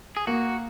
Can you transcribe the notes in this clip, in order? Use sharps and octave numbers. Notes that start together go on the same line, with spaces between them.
G#4
A#3 F#4